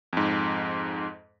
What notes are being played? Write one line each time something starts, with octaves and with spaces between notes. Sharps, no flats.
F2 G#2